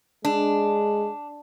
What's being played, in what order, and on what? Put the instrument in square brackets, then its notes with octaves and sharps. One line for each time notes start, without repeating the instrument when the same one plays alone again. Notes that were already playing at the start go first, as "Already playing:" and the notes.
[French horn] G#3 [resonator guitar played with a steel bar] D4